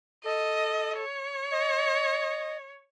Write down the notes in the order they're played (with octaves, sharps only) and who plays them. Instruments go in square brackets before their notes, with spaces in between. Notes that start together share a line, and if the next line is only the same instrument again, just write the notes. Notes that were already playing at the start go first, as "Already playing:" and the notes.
[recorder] A4 [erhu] D#5
[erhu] C#5
[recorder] D#5